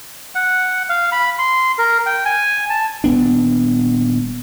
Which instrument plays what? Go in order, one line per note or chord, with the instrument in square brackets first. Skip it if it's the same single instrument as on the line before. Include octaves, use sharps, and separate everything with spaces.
[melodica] F#5
F5
B5
C6
A#4
G5
G#5
A5
[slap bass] D#1 B3 D4